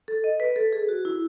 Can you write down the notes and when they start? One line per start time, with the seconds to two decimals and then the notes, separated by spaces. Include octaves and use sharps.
0.08 A4
0.24 D#5
0.40 B4
0.56 A4
0.73 G#4
0.89 F#4
1.05 E4